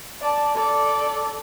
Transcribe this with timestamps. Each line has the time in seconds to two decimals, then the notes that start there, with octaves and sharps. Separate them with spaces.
0.21 D5 A5
0.55 A4 D5